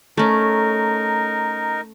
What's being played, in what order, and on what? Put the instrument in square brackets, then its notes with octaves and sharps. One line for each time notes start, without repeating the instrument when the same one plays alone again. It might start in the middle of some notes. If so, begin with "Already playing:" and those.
[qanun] A3 C#4 [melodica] D#4 A#4